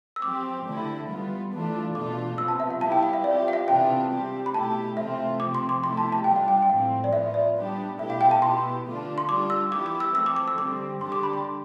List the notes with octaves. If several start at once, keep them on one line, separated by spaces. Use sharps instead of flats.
E6
F3 C4 G4 D6
D3 A3 E4
G3 B3 F4
E3 A3 D4 F4
B2 A3 D4 F4 D6
C3 F3 B3 E6
A5
E5
F5
G3 B3 E4 G4 A5
G5
F5
E5
F3 C4 G4 D5
F5
E5
C3 E3 B3 D4 F4 G5
G3 C4 G4
B5
B2 A3 E4 G4 A5
C3 E3 A3 C4 F4 E5
C3 F3 C4 D6
C6
D6
B2 A3 E4 G4 C6
A5
A5
G3 D4 F4 G5
F5
G5
G5
A2 F3 C4 F5
D5
F3 B3 F4 E5
D5
G3 B3 D4 G4
B2 A3 E4 G4 E5
F5
G5
A5
B2 B3 E4 G4 C6
D3 A3 D4 F4
C6
G3 D4 F4 D6
E6
E3 B3 E4 G4 D6
D6
E6
F3 A3 C4 E6
D6
D6
E6
D3 G3 C4 D6
D3 G3 D4 G4 C6
D6
B5
C6